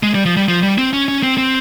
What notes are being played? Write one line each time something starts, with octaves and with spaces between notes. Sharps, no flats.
G#3
G3
F3
G3
F3
G3
C4
C#4
C#4
C4
C4